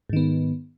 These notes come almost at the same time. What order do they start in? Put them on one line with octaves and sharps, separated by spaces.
G#2 D#3 B3